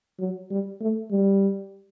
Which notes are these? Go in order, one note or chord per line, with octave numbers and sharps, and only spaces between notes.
F#3
G3
A3
G3